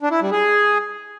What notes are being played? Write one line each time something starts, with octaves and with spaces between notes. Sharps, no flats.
D4
E4
G3
G#4